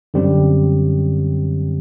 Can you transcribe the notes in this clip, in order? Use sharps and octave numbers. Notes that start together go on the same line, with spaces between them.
F#2 D3 G3 C4 G4